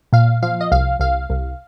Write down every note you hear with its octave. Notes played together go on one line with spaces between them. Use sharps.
A#2 F5
F3 F5
D#5
C2 F5
C2 F5
C2